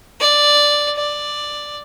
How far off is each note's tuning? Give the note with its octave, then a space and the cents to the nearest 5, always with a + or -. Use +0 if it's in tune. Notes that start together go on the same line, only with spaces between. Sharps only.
D5 +0
D5 +5